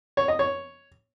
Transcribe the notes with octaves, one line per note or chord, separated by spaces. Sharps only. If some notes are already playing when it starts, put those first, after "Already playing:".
C#5
D#5
C#5